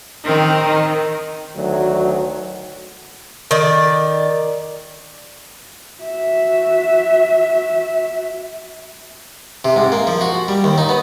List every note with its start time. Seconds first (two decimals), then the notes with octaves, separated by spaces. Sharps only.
0.24 D#3 C4 A#4
0.65 D#3
1.56 D2 D#3 F#3
3.51 D#3 D5
6.01 F#4 E5
9.65 C3
9.76 G#2
9.92 A#3
10.07 F3
10.21 F#4
10.48 G3
10.64 D#2
10.78 D#4
10.89 B3